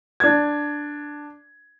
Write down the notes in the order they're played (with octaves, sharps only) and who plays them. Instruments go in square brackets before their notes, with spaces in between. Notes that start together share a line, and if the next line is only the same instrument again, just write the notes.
[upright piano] D4 G#6